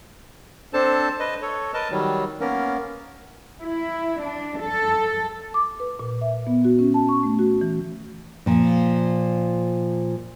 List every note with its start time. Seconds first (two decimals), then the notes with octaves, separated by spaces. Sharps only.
0.73 C4 D4 A4 C5 A5
1.19 B4 D#5
1.42 A4 C#5
1.74 A#4 B4 D#5 A5
1.91 D#3 F#3 G3
2.41 A#3 B3 C#4 A#4
3.60 E4
4.21 D4
4.61 A4
5.54 D6
5.80 B4
5.99 A#2
6.21 E5
6.47 B3
6.65 F#4
6.79 C#4
6.94 A5
7.09 C#6
7.23 A3
7.39 F#4
7.61 E3
8.46 A#2 F3